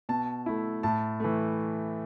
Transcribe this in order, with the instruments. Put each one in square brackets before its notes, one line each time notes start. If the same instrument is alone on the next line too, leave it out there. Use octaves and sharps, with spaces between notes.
[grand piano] B2 A5
A3 E4
A2 A5
E3 A3